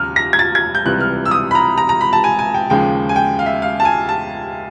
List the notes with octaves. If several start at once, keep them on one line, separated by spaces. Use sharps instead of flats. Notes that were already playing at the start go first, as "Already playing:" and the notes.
Already playing: D#2 C#3 F#3 F6
A#6
G#6
A6
G#6
G6
C#2 C3 E3 G3 F#6
F6
E6
D#6
B5
A#5
A#5
A#5
B5
A5
G#5
G#5
G5
D#2 C#3 F3 G#3 G5
G#5
G5
F5
E5
F5
A5
G#5
A5